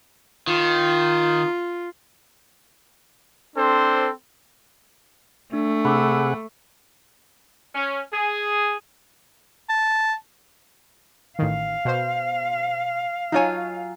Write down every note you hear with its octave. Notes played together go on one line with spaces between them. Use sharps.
D#3 F4
C4 D4 A4 C5
A3 D4
C3 G#4 F#5 B5 D6 E6
C#4
G#4
A5
A1 D#3 F5
B2 C5
F#3 D#4 F4 C#5 G#5